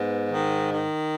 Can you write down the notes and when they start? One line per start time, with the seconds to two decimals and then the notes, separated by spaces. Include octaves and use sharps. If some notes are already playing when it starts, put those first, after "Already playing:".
Already playing: G#2 B3
0.32 D#3
0.72 D#3